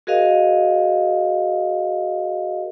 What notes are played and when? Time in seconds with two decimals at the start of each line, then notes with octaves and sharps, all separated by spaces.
0.07 F#4 G#4 A#4 D#5 F5